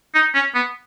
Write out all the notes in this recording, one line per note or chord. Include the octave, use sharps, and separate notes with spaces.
D#4
C#4
B3